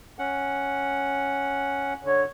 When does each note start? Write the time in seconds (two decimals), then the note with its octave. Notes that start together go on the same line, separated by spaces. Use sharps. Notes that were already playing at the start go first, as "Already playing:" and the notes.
0.19 C#4 F#5
2.05 D3 C#5